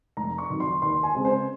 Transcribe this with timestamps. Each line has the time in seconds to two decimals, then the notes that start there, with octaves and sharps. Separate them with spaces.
0.17 F1 A#5
0.38 C#6
0.50 F2 D#3 F#3
0.60 C6
0.82 D#2 C6
1.03 G#5
1.15 C#3 G#3 C4
1.25 C5